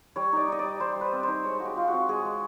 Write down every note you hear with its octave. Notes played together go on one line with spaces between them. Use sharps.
G3 C#5
D#4 D5
D#4 D#5
D5
G3
G3 C5
G3
B4
C4
D#4 C5
G#3 C#5
G#3 F#4
G4
G#3 F4
C4 F#4
G#3 G#4
G#3